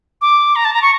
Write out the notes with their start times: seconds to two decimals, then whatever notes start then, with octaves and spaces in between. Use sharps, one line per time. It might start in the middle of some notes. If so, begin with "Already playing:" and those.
0.22 D6
0.56 A#5
0.65 A5
0.74 A#5
0.82 C#6